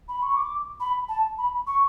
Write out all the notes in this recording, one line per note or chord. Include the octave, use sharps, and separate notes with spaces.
B5
C#6
D6
B5
A5
B5
C#6